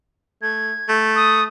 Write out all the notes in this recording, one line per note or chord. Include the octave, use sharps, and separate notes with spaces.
A3 G#6
A3
D#6